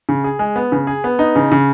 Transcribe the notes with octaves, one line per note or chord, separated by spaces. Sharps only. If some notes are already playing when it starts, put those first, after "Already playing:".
C#3
G#4
G#3
B3
C#3
G#4
B3
D#4
C#3
C#3